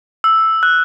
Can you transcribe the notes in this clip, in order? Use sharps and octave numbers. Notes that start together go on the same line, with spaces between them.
E6
F#6